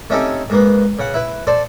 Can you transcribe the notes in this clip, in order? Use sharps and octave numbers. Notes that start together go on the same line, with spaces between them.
A3 C4 C#4 D#4 G4 A4
G#2 A#3 B3
C#3 F#5
E4 B4
A4 C5 D5